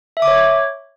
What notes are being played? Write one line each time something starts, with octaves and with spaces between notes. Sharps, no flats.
E5
D6
C#5